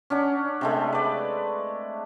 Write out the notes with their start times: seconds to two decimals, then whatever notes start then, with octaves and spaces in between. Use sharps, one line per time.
0.10 C#4 D4 F#5
0.61 C3 G#3 A3
0.93 B4 D5